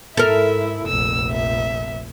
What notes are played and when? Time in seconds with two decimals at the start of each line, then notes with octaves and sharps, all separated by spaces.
0.17 G#2 E4 A4 A#4 E5
0.87 F1 A#1 E6
1.31 E5